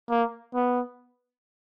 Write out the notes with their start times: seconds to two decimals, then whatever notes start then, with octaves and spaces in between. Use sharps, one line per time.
0.10 A#3
0.55 B3